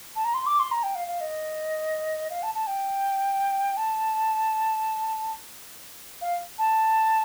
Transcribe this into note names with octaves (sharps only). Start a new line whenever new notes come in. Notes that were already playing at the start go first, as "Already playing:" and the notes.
A5
A#5
C6
D6
C6
A#5
G5
F5
F5
D#5
F5
A5
A5
G5
A5
F5
A5